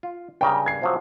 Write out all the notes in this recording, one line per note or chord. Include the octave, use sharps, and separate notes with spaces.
F4
G2 C#3 G5 A#5
G#6 C7
C3 F3 F#3